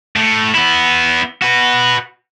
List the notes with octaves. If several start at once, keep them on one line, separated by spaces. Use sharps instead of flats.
A2
B3 E4
F#4 B4